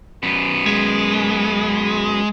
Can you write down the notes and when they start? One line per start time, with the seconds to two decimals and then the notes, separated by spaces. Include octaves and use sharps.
0.23 F#2 B3
0.66 G#3